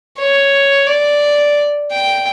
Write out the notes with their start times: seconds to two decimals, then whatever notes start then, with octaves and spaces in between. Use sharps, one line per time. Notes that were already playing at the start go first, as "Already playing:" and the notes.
0.18 C#5
0.87 D5
1.91 G5